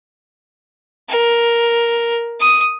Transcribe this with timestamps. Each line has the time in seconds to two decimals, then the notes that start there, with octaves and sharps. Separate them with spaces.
1.09 A#4
2.40 D#6